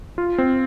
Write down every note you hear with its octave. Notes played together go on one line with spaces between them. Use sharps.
F4
C4